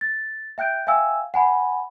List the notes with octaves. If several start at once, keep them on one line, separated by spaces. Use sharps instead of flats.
A6
E5 G5 F#6 G6 D7
E5 F5 G5 G#5 E6
F#5 G#5 B5